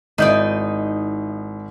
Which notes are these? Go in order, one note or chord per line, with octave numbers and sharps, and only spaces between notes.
G#1 D#4 E4 D5 G6